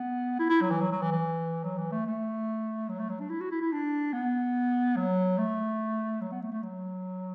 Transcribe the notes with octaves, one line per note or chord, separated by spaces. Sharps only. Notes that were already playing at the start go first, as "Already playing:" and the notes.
Already playing: B3
E4
E4
F#3
E3
F#3
F#3
E3
E3
F#3
E3
A3
A3
F#3
A3
F#3
D4
E4
F#4
E4
E4
D4
B3
F#3
A3
F#3
B3
A3
A3
F#3